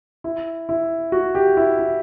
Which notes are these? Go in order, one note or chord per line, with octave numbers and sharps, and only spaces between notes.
E4
E4
F#4
G4
E4
E4